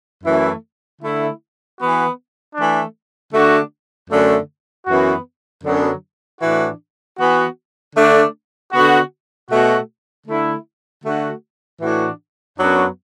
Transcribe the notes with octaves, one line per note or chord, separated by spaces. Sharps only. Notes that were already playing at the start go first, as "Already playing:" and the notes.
F#2 E3 A3 E4
D3 A3 E4
E3 B3 F#4
E3 A3 D4
D3 A3 D4 F#4
F#2 D3 A3
F#2 E3 B3 F#4
F#2 D3 F#3 B3 D4
A2 E3 D4 F#4
E3 B3 F#4
D3 A3 D4
D3 B3 F#4
B2 A3 F#4
D3 A3 E4
D3 A3 F#4
A2 E3 D4 F#4
F#2 F#3 B3 D4 F#4